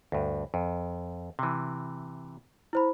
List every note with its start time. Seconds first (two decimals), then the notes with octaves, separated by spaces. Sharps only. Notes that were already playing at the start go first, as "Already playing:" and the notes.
0.12 D2 G2
0.54 F2
1.39 C3 E3
2.73 E4 C5 B5